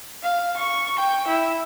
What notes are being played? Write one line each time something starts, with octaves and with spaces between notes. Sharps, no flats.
F5
C#6
G5
E4